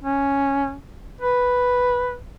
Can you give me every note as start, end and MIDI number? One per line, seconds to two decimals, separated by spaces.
0.04 0.75 61
1.21 2.16 71